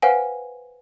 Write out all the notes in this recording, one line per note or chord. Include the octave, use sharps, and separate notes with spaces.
B4 C5 F5 F#5 G#5